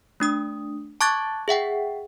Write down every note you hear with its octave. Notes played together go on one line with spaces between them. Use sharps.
A3 D4 D#6
A5 C#6 D6 F#6 G#6 A6
G#4 E5 F#5 G5